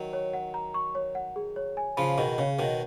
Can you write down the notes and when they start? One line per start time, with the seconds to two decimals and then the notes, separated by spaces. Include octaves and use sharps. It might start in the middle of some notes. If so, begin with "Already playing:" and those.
Already playing: D#3 F#3
0.13 C#5
0.34 F#5
0.54 A#5
0.74 C#6
0.95 C#5
1.15 F#5
1.36 G#4
1.56 C#5
1.77 G#5
1.97 C#3 F3 B5
2.18 B2 D#3 G#4
2.38 C#3 C#5
2.59 B2 D#3 B4